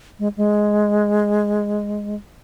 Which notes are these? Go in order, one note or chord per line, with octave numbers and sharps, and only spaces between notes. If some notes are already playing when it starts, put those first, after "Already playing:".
G#3
G#3